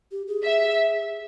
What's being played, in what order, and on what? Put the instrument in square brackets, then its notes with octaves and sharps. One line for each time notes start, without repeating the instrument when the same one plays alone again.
[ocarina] G4
G#4
[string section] E5